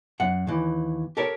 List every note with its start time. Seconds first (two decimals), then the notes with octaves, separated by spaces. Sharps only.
0.20 F#2 F#5
0.47 D#2 E3
1.17 G4 A4 A#4 C#5